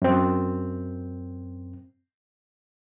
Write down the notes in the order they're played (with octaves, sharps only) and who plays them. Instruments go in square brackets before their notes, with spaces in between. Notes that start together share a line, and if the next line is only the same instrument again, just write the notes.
[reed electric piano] F#2 C4